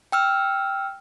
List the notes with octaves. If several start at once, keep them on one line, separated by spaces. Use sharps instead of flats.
G5 E6 F6